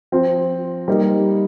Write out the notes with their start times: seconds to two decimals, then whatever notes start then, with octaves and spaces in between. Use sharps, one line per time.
0.12 F3 C4 F4 C5
0.88 G3 A#3 D#4